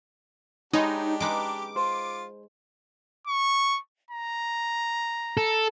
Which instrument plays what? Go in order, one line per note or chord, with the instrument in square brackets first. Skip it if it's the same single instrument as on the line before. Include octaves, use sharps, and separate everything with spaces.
[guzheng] G#3 [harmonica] D4 G4 [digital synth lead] D#4 [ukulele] C#5 B5
[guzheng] G#3 D#4 B4 [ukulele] C#4 [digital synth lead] D6
[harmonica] F4 [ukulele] C5
[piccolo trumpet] C#6
A#5
[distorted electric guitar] A4